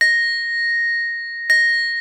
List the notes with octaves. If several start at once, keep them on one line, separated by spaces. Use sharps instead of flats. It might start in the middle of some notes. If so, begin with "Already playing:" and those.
A#6
A#6